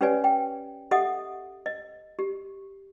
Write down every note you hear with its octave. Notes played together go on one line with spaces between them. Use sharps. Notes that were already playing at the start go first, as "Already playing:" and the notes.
C#4 G4 B4 C#5 D5 G#5
G5
G4 A4 D#5 E5 F#5 D#6
D#5
G4